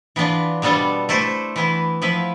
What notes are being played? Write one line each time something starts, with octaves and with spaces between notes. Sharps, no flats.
E3 B3 D4 F4
B2 G3 B3 D4 A4
A3 E4 A4 C5
E3 B3 E4
F3 B3 E4 B4